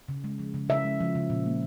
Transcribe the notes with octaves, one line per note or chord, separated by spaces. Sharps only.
C#3
G#3
F3
C#3
C#3 E5
G#3
F3
C#3
A#2
A#3